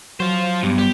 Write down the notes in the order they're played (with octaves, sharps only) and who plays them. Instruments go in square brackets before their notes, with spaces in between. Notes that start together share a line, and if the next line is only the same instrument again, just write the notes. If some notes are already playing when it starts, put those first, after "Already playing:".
[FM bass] F#3 [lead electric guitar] F4 C5
[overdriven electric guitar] G2 [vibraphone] B3
[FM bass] G3 [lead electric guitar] G4